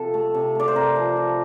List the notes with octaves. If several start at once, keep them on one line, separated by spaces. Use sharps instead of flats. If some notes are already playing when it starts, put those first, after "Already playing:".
Already playing: C3 F3 A4
A3
C3
A3 D5
C5
C3 A#4
F3
F3